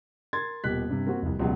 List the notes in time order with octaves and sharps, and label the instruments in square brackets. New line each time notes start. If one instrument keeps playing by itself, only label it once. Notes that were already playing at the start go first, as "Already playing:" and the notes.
[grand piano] A#4 C6 G#6 A6
D#1 B2 A#3 G4 F#6 B6
G2 C3
A#3 C4 F#4
F1 C2
C#2 B2 F#3 G3